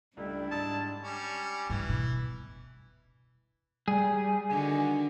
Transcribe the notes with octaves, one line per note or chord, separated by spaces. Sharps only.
C#2 G3 A3 D4 E4
G#2 A5 D#6
G3 C#4
G2 E3
B2
G3 G#4
D3 D#3 F#4 G#5